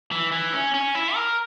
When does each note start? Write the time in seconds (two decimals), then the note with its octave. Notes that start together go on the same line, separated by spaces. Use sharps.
0.12 E3
0.32 E3
0.53 C#4
0.74 C#4
0.95 E4
1.14 A#4